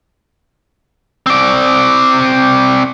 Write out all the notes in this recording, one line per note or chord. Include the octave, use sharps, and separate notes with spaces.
C4 D5